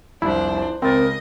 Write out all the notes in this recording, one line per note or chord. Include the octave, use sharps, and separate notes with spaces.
F1 C2 D4 E4 C5
C#2 C4 A#4 D#5 A6